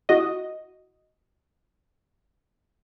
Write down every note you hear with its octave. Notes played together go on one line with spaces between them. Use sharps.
E4 F#4 D#5